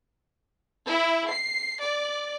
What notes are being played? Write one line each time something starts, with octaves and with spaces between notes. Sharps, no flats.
E4
C7
D5